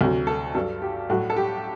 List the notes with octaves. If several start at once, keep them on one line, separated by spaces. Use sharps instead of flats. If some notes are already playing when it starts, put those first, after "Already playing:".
D2 C3 F#3
A4
G2 F#3 A4
G4
A2 F#3 F#4
A4
G4